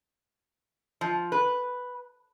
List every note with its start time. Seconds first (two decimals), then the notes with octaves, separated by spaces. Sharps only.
1.01 F3
1.32 B4